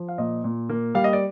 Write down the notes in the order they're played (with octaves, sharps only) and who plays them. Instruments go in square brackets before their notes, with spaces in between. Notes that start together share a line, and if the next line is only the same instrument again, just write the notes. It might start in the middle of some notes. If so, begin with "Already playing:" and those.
Already playing: [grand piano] F3
F5
A#2 D#5
A#2
A#3
G3 F5
D#5
D5